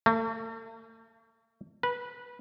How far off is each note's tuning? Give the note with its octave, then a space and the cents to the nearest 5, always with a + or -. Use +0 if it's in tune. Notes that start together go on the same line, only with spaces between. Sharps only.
A3 +45
B4 -15